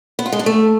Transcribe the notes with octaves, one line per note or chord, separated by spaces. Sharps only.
B3
F4
G#3
D4
A3